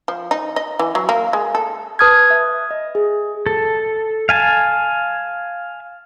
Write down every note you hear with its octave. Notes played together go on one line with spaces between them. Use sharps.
F3
D#4
D#5
E3
F#3
A#3
G#3
A4
B4 A5 D#6 F6 G#6
E5
D#5
G#4
A4
F5 G#5 A5